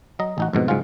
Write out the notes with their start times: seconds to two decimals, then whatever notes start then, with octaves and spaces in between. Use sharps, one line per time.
0.19 F#3 D#5 A#5
0.38 A1 D#4 F#4
0.53 F2 G#2 B2
0.68 G#2 C#3 F#3 C#4 F4